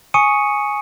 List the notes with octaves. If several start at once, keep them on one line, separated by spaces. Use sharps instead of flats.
G#5 C#6 D#6 C#7 D#7